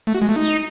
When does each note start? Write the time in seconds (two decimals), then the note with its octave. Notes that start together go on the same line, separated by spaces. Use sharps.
0.07 A3
0.14 F#4
0.22 G#3
0.29 A3
0.36 D#4